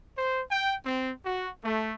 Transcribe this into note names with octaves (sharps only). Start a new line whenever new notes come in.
C5
G5
C4
F#4
A3